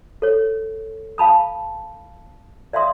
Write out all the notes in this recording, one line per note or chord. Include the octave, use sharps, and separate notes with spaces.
A4 C#5
F5 A5 B5 D#6
D5 E5 F5 C6 D#6